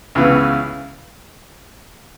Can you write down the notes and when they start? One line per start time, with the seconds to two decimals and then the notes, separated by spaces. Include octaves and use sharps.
0.15 C#2 C#3 E3 B3